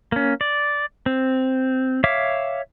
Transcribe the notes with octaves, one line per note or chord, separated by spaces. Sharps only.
A#3 C#4
D5
C4
C#5 E5 F5 D6